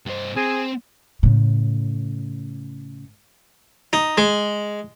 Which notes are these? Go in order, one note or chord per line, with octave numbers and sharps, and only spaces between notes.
G2 C5
C4 G#4
A2 C#3
D#4
G#3